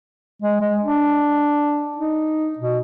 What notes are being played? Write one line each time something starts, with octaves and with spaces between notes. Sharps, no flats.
G#3
G#3
D4
D#4
B2